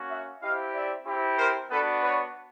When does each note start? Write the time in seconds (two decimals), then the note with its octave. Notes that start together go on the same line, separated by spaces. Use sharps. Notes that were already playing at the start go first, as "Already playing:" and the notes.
Already playing: A#3 C#4 F#4
0.09 E5 F#5
0.41 C4 E4 G4 D#5 F5
0.73 D5 E5
1.06 C4 E4 G4
1.38 A#4 C5
1.70 B3 D4 F#4 A4 B4
2.02 B4 C#5